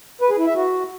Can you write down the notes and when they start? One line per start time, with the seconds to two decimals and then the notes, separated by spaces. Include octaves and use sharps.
0.21 B4
0.30 G#4
0.38 E4
0.47 E5
0.55 F#4